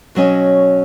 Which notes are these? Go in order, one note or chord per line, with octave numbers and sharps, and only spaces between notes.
B2 F#3 C#4 D#5